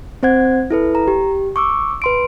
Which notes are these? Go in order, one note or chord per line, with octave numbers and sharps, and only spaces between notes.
C4 C5 F#5 G#6
E4 A4 B4
A#5
G4
C#6 D6 E6
B4 C6 D7